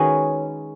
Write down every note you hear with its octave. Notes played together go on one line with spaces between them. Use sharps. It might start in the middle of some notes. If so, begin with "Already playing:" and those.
Already playing: D#3 G#3 C#4 F#4 G#4 B4 C#5